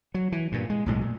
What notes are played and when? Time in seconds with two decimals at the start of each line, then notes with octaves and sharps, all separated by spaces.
0.14 F#3
0.32 E3
0.52 G2 A#2
0.70 G#3
0.86 B1 A2 F3 G#3
1.01 A#2